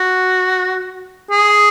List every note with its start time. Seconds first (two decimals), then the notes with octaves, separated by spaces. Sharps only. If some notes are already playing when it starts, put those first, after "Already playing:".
Already playing: F#4
1.31 G#4